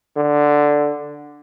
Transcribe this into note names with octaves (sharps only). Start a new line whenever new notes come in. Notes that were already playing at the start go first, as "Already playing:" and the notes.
D3